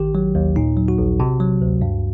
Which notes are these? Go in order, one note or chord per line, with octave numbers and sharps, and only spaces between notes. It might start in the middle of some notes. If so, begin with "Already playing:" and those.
Already playing: A1 D#3 G4
F#3
D#2
A#2 D#4
F#3
F#4
A#1
C3
F#3
D2
G2